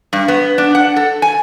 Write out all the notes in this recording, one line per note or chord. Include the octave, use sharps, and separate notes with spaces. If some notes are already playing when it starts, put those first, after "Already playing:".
G2
B3
D4
F#5
A4
G#5